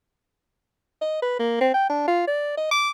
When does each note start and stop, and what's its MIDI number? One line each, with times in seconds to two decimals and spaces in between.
1.01 1.20 75
1.22 1.39 71
1.39 1.56 58
1.61 1.70 60
1.74 1.89 79
1.90 2.04 62
2.08 2.22 65
2.27 2.54 74
2.57 2.67 75
2.71 2.90 86